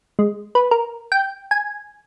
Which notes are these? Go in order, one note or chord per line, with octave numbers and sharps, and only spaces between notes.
G#3
B4
A#4
G5
G#5